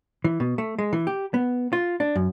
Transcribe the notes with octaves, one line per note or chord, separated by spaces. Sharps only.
E3
B2
A3
G#3
E3
G4
B3
F4
D4
F#2